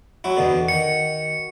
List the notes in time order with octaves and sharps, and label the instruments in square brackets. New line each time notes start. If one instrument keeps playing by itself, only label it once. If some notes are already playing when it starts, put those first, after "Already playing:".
[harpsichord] F#3 E4 [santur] F#4
[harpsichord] E2 B2 D3
[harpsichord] D#3 [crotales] C#7